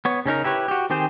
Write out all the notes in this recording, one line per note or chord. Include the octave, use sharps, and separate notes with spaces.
B3 C#5
C#3 C#4 D#4 A#4
E4 G4 B4 C#5
F#4 G4
D#3 C4 G4 G#4 C5